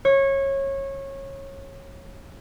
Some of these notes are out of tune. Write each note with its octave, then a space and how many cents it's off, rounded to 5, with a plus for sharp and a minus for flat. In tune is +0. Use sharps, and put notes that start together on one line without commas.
C#5 -20